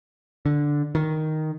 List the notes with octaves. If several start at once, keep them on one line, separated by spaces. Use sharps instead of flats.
D3
D#3